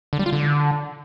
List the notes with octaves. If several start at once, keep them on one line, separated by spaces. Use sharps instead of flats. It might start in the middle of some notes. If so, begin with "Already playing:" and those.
D3
G3
F4
D3